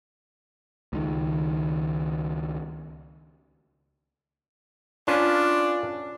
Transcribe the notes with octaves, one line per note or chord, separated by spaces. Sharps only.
C#2 D#3
C#4 D4 F4 B4